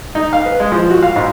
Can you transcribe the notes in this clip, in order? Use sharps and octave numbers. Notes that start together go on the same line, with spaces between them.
D#4
F5
B4
G#3
F3
F#4
F5
G#2